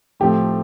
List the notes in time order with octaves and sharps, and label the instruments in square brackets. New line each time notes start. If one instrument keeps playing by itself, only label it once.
[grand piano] A2 F3 A3 C4 G4